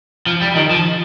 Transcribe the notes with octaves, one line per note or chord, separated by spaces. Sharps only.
F3
G3
D#3
F3